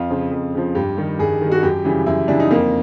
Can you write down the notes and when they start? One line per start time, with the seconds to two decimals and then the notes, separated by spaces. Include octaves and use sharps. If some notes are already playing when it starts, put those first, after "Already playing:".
Already playing: F2 F4
0.10 C#3 F3
0.32 F2
0.54 C#3 F3
0.75 G2 G4
0.97 D#3 G3
1.19 G2 G#4
1.41 D#3 G3
1.52 F#4
1.63 F#2 G4
1.85 C#3 E3 G3
2.06 F#2 E4
2.28 C#3 E3 G3 D4
2.40 D#4
2.51 F2 A#3